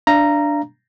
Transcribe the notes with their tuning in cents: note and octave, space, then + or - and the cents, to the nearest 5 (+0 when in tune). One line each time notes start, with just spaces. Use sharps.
D4 +0 F5 -35 A#5 +0